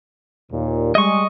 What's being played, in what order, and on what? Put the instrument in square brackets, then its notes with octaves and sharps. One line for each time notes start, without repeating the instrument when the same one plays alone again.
[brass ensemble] D#2 A#2
[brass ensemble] G3 G#3 [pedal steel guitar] D#5 C#6